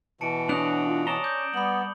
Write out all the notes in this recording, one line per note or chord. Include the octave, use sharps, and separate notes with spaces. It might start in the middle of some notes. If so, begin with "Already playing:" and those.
B2 E3 A5 C#7 D7
C#4 D4 F#4 D#6 F#6 F7
F4
C#4 D5 A5 A#5 D#6 G7
D6 G6
G3 B3 B5 F#7